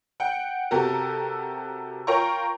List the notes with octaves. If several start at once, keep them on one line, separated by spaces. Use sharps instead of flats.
F#5 G5
C3 F#4 G4 A4 A#4
F4 A#4 C#5 G5 A#5 C#6